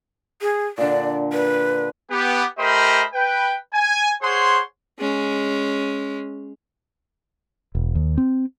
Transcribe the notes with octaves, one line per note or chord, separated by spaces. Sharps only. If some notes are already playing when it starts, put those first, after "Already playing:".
G#4
A#2 D3 D5
B4
B3 G4
A3 G4 A#4 C5 D#5 B5
B4 G5
G#5
G#4 C5 C#5 F#5 C6
G#3 C#4
E1
D#2
C4